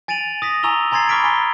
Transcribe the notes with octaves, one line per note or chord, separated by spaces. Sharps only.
G#5 A6 D7 D#7 F7 F#7
D#6 A#6 B6
G#5 A#5 C#6 E6 F7 G7
G#5 A#5 C6 G#6 A6 C7
B5 C#6 D6 F6 B6 D7
G#5 C6 A6 B6 D7 G7